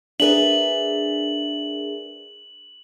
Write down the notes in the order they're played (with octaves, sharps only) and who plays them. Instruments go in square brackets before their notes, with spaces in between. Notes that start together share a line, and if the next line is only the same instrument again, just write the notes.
[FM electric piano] D4 G#4 A#4 [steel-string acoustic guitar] B4 D5 E5 [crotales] F#7